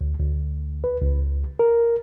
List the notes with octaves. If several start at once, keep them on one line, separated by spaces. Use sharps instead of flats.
D2
D2
B4
C#2
A#4